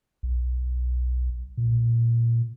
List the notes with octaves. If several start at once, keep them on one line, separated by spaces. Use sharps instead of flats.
B1
A#2